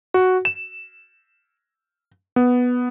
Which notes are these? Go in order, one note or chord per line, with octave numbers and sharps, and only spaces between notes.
F#4
E7
B3